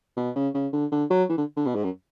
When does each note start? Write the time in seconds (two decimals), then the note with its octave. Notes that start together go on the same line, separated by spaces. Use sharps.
0.17 B2
0.35 C#3
0.54 C#3
0.73 D3
0.91 D3
1.10 F#3
1.29 E3
1.37 D3
1.57 D3
1.66 B2
1.75 G#2
1.84 F#2